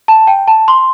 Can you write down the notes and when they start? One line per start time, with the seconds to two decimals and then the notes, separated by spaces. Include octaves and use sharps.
0.08 A5
0.27 G5
0.47 A5
0.68 C6